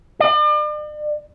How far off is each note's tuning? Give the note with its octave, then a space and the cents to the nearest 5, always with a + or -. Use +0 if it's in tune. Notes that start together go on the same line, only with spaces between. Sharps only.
D5 +40